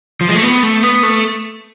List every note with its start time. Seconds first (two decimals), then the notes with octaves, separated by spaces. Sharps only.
0.21 F3
0.28 G#3
0.35 A3
0.43 B3
0.63 A3
0.83 B3
1.03 A3